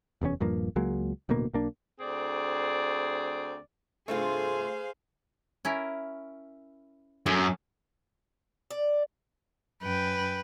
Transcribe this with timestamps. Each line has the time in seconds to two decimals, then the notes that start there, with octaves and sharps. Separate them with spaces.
0.21 F1 E2 D3 C#4
0.40 D#1 G2 F3 A#3
0.76 C#2 F#3 G#3 A#3
1.29 D1 D2 B2 A#3
1.53 B1 A#3 D4
2.00 D2 C4 G#4 D5
4.08 G2 C3 A3 F4 G#4 C5 F5
5.65 C#4 E4 A#4
7.26 F#2 C#4 A4
8.71 D5
9.83 F#2 B4 G5